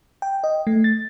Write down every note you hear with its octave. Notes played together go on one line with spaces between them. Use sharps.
G5
D#5
A3
A6